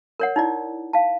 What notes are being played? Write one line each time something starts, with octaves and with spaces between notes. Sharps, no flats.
A#4 C#5 F#5
D#4 E4 D5
F5 A5